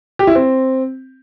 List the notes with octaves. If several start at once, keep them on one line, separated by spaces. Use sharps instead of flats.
G4
E4
C4